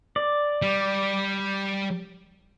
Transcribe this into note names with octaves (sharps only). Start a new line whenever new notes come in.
D5
G3